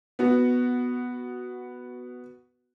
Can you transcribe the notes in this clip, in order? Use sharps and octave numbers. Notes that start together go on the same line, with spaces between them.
B3 F#4